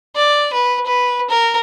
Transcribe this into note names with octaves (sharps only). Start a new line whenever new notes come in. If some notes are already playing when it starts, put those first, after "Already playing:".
D5
B4
B4
A#4